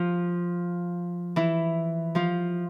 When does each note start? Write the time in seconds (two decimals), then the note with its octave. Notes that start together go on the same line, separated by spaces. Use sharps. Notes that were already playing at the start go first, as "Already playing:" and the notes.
Already playing: F3 F4
1.36 E3 E4
2.15 F3 F4